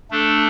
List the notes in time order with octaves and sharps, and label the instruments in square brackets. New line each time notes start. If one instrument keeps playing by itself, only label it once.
[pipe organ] A3 D4 A4